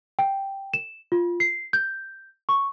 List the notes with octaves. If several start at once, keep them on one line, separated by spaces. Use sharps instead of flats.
G5
E7
F4
C7
G6
C#6